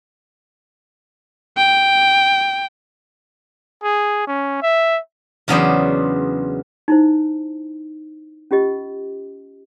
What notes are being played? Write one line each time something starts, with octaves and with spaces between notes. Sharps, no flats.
G5
G#4
C#4
E5
E2 C#3 F#3 B3 D4 C5
D#4 E4 C5
C#4 F4 G4 D#5